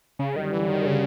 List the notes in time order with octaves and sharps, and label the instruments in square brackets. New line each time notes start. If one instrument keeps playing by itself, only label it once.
[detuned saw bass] C#3
[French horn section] F#2 D3 G3 [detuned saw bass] D#3
[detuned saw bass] E3
D#3
C#3